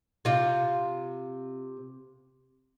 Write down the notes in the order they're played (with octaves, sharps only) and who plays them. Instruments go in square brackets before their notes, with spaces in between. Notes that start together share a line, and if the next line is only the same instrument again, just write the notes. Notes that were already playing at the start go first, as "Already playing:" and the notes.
[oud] C3 F4